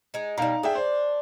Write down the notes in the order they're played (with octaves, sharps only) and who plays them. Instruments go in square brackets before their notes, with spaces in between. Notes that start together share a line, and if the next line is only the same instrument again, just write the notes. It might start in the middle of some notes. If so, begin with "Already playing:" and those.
[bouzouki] G#3 D#4
[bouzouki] B2 G3 [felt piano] D#4 F5 A#5
[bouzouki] D4 [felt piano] G#4 E5 G5
[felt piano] C5